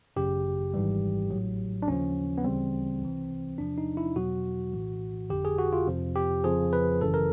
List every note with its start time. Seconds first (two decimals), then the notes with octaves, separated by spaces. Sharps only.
0.16 G#1 F#2 C#3 G4
0.74 G#1 G#2 E3 G3
1.31 A1 A2 F#3
1.82 D4
1.87 D#2 C#3 F3 C#4
2.38 B3
2.44 D2 C#3 E3 G3 C4
3.01 C2 C3 E3
3.58 E2 C3 F3 D4
3.78 D#4
3.97 E4
4.16 E2 B2 F#3 F#4
4.73 A#1 A2 E3
5.30 G1 F2 D3 G4
5.45 G#4
5.59 F#4
5.73 F4
5.87 F2 C3 F3
6.16 G4
6.44 F2 C#3 F3 G#4
6.73 B4
7.01 G#1 F#2 C#3 E3 A4
7.14 A#4